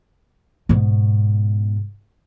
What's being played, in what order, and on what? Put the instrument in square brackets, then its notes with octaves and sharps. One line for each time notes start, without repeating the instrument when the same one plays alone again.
[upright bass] G#2 B2